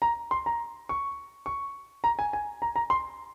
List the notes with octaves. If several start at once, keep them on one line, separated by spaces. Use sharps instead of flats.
A#5
C6
A#5
C#6
C#6
A#5
G#5
G#5
A#5
A#5
C6